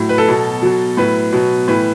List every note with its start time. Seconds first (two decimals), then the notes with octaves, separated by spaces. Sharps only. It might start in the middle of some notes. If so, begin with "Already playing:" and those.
Already playing: A2 F#3
0.09 B4
0.18 A4
0.28 B2 F#3
0.62 B2 F#3
0.97 A2 F#3 B4
1.33 B2 F#3
1.68 A2 E3 B4